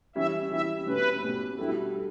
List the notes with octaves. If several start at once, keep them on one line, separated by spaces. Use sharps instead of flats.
E3 G3 C#4 E4 E5
E3 G3 C#4 E4 E5
B2 A3 C#4 G4 B4
B2 A3 C#4 G4
G3 D4 E4 F#4 A4
A4